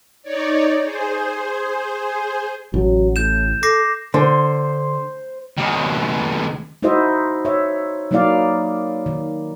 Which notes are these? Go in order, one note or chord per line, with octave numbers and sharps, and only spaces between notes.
D#4 C#5 D5
G#4 C5
A1 F#3
A2 G6 E7
A4 D6 A#6 C7
D3 C5
C#2 D#3
D#4 E4 F#4 C5 D#5 E5
C#5 E5
F#3 A#3 D#4 E4 D5 F5
D#3